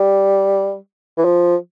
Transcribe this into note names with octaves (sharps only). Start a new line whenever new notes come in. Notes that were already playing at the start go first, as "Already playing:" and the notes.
Already playing: G3
E3
F3